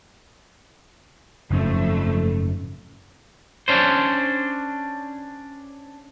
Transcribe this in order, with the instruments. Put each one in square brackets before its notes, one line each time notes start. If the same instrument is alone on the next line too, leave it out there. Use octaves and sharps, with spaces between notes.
[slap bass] F#1 G#2 C#4 [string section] F2 A3
[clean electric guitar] C#4 D4 C5